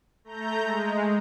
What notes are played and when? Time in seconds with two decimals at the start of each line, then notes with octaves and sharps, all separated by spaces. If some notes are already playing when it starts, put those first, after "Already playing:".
0.24 A3 A#5 G6
0.61 G#3